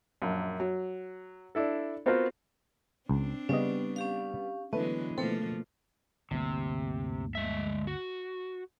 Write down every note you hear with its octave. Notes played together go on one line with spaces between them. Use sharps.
A#1 F#2
F#3
D4 E4 A4
B3 C4 F4 F#4 A#4 C5
C#2 C4 D4
C#3 G3 B3 C#4 D#5
C#4 G4 F5
D3 E3 F#3 G#3 A3 B3 B4
B2 F3 A3 A#3 C4 A4
G1 D2 C3 A#3
G#3 E5
F#4